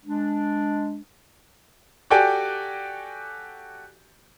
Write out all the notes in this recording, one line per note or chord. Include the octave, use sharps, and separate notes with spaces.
G#3 D4
F#4 G4 A4 D5 G5 G#5